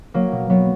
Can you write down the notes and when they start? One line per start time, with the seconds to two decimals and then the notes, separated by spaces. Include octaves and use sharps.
0.14 F#3 A#3
0.32 B2
0.50 F#3 B3